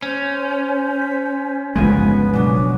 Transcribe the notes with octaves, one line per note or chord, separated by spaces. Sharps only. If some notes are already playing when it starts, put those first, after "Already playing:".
C#4 C5
B6
G1 C#2 F3 G#3 B3 G#5 B6
B2 F#3 D4